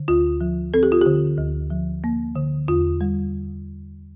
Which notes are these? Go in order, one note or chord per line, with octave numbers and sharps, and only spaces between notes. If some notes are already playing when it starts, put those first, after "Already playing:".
Already playing: D3
D2 F4
F3
C4 A4
G4
F4
D3 G4
D2
F3
A#3
D3
E2 F4
G3